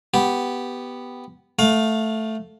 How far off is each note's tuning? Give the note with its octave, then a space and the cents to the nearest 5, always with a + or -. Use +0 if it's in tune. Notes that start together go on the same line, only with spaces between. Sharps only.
B3 +0 G4 +0
A3 +0 F5 +20